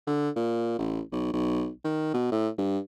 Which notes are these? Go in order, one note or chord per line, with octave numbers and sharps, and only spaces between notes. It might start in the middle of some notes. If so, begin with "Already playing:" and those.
D3
A#2
A1
B1
B1
D#3
B2
A2
G2